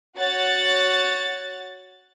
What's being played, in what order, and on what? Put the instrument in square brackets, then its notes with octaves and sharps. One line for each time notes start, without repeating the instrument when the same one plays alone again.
[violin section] F#4 C#5 F#5 A6